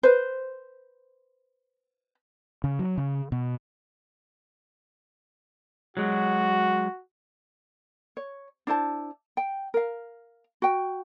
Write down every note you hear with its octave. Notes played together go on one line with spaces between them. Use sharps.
B4 C5
C#3
F#3
C#3
B2
F#3 G#3 F#4
C#5
D4 E4 C5 A5
G5
A#4 F5
F#4 G5